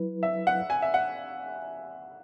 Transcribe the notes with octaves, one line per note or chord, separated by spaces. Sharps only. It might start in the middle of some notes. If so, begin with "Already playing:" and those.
Already playing: F#3 E4 B4
E5
F#5
G#5
E5
F#5